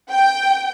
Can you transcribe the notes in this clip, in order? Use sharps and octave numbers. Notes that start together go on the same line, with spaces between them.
G5